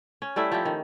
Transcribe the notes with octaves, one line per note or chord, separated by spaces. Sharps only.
C#4
G3 A3 E4 E5
F3 E4 G4
D#3